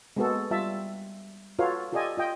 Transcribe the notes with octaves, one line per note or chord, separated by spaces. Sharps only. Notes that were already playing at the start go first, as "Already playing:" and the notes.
G#3 A#3 B3 F#4 G#4 A4
G3 F4 E5 A5
F4 F#4 A4 B4 C#5 F5
F4 G4 A4 D5 D#5 G#5
F4 D#5 G5